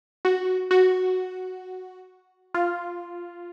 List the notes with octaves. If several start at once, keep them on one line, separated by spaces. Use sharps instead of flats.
F#4
F#4
F4